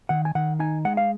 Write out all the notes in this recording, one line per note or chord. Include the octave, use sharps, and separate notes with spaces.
D#3 F#5
G#5
D#3 F#5
D#4 G#5
G#3 F#5
F5